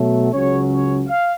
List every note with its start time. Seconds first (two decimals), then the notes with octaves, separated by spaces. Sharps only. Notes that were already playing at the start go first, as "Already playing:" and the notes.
Already playing: B2 F#3 A3
0.32 C#2 C#3 F#3 C#4 C#5
0.70 C#5
1.07 F5